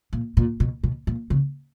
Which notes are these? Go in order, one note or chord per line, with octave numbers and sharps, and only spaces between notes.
A#2
A#2
B2
B2
A#2
C#3